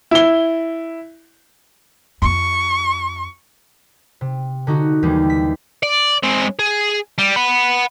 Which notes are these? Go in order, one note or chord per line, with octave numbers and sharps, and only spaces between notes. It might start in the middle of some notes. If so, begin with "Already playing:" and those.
E4 G7
F2 F4 C#6
C3
D3 D#4 F#4
D#2 E3 G3 G#3
B6
D5
G#3 C4
G#4
G3
F#5 B5